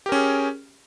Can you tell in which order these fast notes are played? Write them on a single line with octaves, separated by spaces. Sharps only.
G4 A#4 C#4 G#4